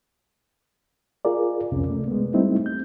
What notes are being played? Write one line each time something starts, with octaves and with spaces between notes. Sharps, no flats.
F4 G#4 A#4 D5
C2 F2 C3 C#4
A3
G#3 B3
G3 A3 C4 D#4 E4
G6